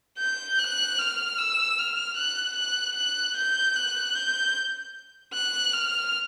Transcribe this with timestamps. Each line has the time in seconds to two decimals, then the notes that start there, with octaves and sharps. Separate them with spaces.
0.19 G6
0.58 F#6
0.98 F6
1.38 E6
1.78 F6
2.16 F#6
2.56 F#6
2.96 F#6
3.36 G6
3.76 F#6
4.15 G6
5.33 F#6
5.73 F6